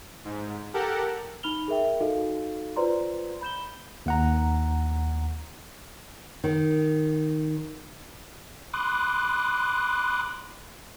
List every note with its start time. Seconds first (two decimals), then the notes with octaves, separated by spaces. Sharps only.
0.25 G#2
0.74 G4 A4 A#4 F#5
1.43 D#4 B5 F6 F7 G7
1.68 G#4 A#4 E5 G5
2.01 D#4 F#4 A4 D#5 F5
2.76 F4 B4 C5 D5 A#5 C6
3.41 B5 G6 E7 G7
4.06 D#2 F#5 A#5
6.44 D#3
8.74 B5 C6 D6 D#6 F#6